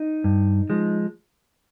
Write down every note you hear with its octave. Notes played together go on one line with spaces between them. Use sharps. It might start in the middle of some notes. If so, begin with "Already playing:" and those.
Already playing: D#4
G2
F3 G#3